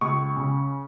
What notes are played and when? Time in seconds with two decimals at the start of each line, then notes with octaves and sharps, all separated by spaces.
0.01 C#2 C#6
0.36 C#3